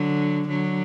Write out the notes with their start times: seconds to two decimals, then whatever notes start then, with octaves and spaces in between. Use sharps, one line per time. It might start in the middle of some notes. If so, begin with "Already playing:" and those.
Already playing: D3 F#3
0.48 D3 F#3